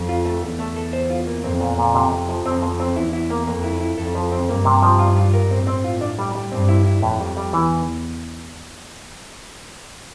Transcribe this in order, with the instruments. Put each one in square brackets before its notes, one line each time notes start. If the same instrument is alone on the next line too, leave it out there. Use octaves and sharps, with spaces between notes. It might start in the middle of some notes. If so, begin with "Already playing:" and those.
Already playing: [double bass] F2
[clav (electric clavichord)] F4
A3
[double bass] E2 [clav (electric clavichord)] A4
[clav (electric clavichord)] A3
A4
C5
F4
A#3
[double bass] F2 [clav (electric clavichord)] C4
[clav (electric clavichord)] A#2
A#2
C3
C3
F3
[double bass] F2 [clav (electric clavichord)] C4
[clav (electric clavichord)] F3
C4
[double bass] E2 [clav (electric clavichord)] E4
[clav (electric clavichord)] E4
A#3
[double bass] F2 [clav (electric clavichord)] A#3
[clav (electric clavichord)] E4
E4
[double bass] F2 [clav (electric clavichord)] A4
[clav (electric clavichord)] F3
C4
[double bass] G2 [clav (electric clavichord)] A#3
[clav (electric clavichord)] C3
F3
F4
F4
A#4
[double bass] A2 [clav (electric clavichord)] C4
[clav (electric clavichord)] C4
F4
D4
G3
G3
[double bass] G2 [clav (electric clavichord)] C4
[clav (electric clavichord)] E4
E4
[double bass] F2 [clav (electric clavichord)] A2
[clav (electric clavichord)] G3
G3
[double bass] E2 [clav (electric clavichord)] E3